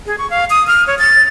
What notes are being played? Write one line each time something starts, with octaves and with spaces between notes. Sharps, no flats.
G#4
C#6
F5
D#6
F6
C#5
A6